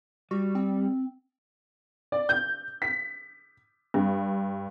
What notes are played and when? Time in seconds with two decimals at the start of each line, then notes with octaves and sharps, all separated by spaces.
0.31 G3 F#4
0.55 C4
2.12 D5
2.29 G6
2.82 B6
3.94 G2